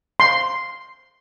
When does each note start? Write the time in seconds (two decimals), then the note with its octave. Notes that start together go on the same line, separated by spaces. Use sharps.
0.20 C6